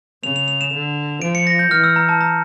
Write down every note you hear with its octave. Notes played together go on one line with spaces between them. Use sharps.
C#3 F7
F7
F7
E7
D3
F3 D7
C#7
A#6
G6
E3 F6
E6
A#5
A5
A#5